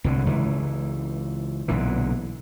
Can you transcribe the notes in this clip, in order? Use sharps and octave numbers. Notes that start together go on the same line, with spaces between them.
C2 A2 D3
C#2 E3
B1 A#2 D3 E3